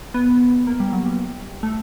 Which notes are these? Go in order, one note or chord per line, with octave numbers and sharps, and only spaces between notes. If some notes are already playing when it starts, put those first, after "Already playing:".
B3
A#3
G3
F#3
G3
A3